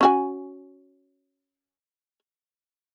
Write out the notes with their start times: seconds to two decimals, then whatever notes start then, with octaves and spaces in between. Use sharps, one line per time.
0.01 C#4 F#4 G#5